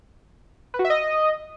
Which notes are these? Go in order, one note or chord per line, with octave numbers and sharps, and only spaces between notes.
B4
F#4
E5
D#5